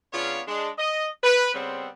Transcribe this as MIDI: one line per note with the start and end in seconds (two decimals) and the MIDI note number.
0.13 0.41 49
0.13 0.41 59
0.13 0.41 62
0.13 0.41 65
0.13 0.41 73
0.13 0.41 77
0.48 0.69 56
0.48 0.69 62
0.78 1.07 75
1.23 1.52 71
1.54 1.88 49
1.54 1.88 55
1.54 1.88 59
1.54 1.88 60